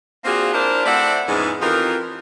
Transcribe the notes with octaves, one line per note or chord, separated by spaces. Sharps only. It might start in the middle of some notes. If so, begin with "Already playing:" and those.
A#3 C4 D4 F4 F#4 G#4
D4 E4 F4 A#4 C5 D5
A3 C4 E4 D5 E5 F#5
E2 G#2 E3 F3 G#3 C#4
F2 E3 D#4 F4 G4 A#4